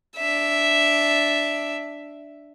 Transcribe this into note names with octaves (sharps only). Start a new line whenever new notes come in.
D4 E5